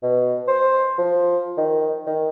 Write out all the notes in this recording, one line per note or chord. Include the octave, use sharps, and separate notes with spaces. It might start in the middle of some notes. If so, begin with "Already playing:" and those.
B2
C5
F3
D#3
D#3